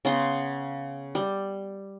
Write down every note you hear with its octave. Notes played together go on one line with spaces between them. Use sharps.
C#3 B3 C6
G3